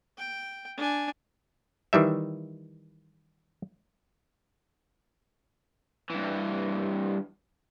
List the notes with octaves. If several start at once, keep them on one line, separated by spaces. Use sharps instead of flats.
G5
D4 G#5
D#3 E3 G3 E5
G2 E3